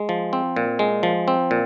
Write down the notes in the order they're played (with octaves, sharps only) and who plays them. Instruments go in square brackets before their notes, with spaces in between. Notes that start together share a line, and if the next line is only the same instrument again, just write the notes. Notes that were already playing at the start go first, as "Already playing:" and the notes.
Already playing: [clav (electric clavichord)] G#3
F3
C4
A#2
G#3
F3
C4
A#2